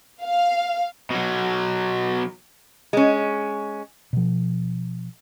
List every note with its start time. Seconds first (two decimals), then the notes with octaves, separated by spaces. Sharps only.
0.23 F5
1.10 B2 F#3
2.93 G#3 C#4
4.13 B2 F3